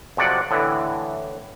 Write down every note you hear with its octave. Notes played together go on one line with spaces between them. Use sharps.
F2 C3 F#3 D5 F#5
A2 D3 E3